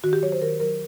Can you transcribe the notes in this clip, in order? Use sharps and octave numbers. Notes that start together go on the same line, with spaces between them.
D#3 F#4
G4
F#3 C#5
C5
D#3 A#4
F#3 A#4